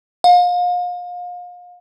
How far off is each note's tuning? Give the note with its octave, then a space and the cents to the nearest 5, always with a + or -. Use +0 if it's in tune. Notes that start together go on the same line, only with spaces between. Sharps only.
F5 +35